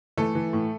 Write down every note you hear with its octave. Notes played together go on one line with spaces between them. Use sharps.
E3 A3 A4
E3
A2